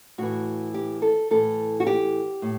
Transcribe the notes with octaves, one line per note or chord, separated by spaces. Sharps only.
A2 E3 F#4
G4
A4
A2 E3 A4
F#4
G4
A2